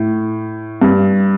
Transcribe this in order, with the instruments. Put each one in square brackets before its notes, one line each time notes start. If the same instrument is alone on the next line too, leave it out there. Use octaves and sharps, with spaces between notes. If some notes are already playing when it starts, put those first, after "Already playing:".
Already playing: [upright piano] A2
G2